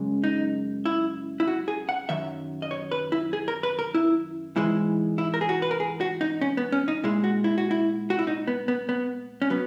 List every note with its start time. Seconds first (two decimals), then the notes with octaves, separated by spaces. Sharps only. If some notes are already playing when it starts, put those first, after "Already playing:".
Already playing: F#2 C#3 G#3
0.24 D#4
0.85 E4
1.40 E4
1.47 F#4
1.68 G#4
1.89 F#5
2.09 F#2 D#3 F#3 E5
2.62 D#5
2.71 C#5
2.92 B4
3.12 E4
3.33 G#4
3.48 A#4
3.63 B4
3.79 A#4
3.95 E4
4.56 G#2 E3 G#3 E4
5.18 E4
5.34 A#4
5.41 G#4
5.49 F#4
5.62 B4
5.71 A#4
5.80 G#4
6.01 F#4
6.21 D#4
6.41 C#4
6.57 B3
6.72 C#4
6.88 D#4
7.03 A#2 G#3 E4
7.24 F#4
7.44 E4
7.58 F#4
7.71 E4
8.10 F#4
8.19 E4
8.27 D#4
8.47 B3
8.68 B3
8.89 B3
9.42 C#4
9.50 F#3 B3